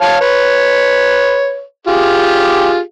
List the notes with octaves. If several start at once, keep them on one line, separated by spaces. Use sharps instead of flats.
C#5 F5 A5
B4 C#5
F4 G4 G#4